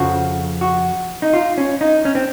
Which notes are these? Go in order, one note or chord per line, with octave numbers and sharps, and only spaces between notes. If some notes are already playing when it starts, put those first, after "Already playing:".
Already playing: F2 C#3 F3 F#4
F#4
D#4
F4
C#4
D#4
C#4
C4